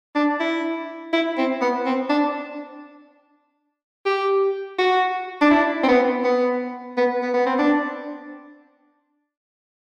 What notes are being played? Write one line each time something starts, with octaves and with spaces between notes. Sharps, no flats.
D4
E4
E4
C4
B3
C4
D4
G4
F#4
D4
E4
C4
B3
B3
B3
B3
B3
C4
D4